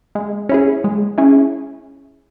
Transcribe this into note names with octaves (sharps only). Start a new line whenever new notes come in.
G#3
C#4 E4 G#4
G#3
C#4 E4 G#4